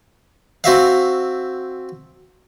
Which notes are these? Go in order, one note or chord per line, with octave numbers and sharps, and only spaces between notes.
C4 F#4 E5 F5